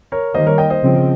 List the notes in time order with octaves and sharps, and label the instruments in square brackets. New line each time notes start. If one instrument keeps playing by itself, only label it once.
[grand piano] A#4 C#5
[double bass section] D#3 G3 A#3 [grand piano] C5 D#5
[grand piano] A#4 C#5
D#5 G5
C5 D#5
[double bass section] C#3 F3 C4